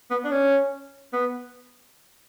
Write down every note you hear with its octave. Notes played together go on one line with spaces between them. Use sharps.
B3
D4
C#4
B3